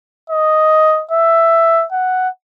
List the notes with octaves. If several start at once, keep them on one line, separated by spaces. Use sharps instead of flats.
D#5
E5
F#5